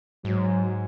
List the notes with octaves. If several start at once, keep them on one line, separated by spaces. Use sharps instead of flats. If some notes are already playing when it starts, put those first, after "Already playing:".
G#2 F#3